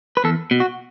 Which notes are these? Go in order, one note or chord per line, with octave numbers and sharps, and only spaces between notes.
B4
E2 A4
B2
F#4